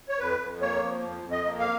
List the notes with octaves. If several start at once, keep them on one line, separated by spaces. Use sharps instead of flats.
C#5
F2 B4
F2
A#3 C#5
F3
F2
F2
D#5
A#3
F5